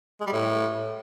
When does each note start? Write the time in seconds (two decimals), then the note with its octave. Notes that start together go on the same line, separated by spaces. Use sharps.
0.21 G#3
0.27 G3
0.32 A2